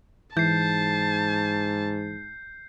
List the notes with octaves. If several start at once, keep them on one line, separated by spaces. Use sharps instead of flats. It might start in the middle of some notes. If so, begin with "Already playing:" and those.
G#2 E3 A5 G6 C7